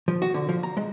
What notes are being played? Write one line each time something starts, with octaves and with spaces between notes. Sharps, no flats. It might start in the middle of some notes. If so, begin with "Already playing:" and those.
F3
F#4
D3
F3
A#5
G#3